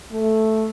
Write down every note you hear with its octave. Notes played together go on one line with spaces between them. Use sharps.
A3